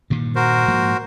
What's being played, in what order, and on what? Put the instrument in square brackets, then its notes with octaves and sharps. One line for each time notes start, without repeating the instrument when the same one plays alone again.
[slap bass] G2 A#2 D#3
[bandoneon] F#4 A#4 C5
[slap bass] G#2 F3 A#3